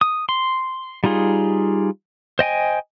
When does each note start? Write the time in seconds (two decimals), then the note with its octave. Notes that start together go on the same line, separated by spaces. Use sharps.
0.01 D#6
0.29 C6
1.04 G3 D#4 F4 G#4
2.39 C5 D#5 G5 G#5